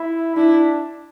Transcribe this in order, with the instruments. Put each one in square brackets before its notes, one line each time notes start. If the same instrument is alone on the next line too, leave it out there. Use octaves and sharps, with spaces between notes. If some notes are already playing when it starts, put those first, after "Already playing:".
Already playing: [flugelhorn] E4
[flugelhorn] D4 [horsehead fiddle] E4